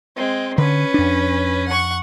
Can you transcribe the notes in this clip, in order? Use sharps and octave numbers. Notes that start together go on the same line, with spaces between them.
G#3 C4
D3 C#4 B4
F2 D4
F#5 C#6